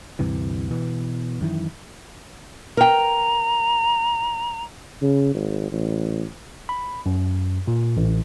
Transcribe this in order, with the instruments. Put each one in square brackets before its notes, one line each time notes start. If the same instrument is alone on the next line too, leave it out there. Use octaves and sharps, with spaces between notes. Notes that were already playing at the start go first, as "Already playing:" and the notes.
[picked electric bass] D2 G2 C3 E3
B2 E3 B3
F#2 D#3 E3
[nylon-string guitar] A#4 G5 [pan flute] A#5
[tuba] C#3
G#1
A1
[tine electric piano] B5
F#2
A#2
A1